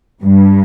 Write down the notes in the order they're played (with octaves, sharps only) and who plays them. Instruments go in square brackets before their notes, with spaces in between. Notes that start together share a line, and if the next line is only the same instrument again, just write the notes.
[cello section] G2